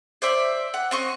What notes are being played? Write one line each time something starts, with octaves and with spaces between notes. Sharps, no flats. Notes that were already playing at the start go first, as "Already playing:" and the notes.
C5 D5 E5
F#5
C4 D#5 C#6